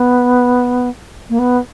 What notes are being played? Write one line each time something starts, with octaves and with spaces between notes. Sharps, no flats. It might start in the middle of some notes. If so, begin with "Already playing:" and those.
Already playing: B3
A#3
B3